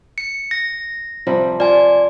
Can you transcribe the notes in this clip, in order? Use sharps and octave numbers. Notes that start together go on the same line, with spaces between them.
C#7
A#6
C3 F3 G3
F4 D5 G#5